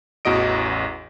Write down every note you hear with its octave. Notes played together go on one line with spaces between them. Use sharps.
A1 E2 F#4 D#5 D7